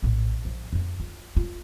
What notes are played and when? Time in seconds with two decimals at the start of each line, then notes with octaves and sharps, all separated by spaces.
0.02 A#1 A2
0.45 F3
0.73 F2 D#4
1.00 F4
1.37 F4